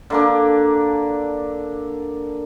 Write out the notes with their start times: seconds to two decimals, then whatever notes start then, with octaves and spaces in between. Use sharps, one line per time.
0.10 D3 A#3 D4